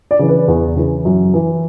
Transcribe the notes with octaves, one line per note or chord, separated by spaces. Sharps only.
D5
C#3 E3
B4
E2
C#3 E3
F#2
E3